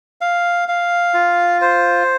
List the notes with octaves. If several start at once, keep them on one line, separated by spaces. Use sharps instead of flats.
F5
F5
F4
C5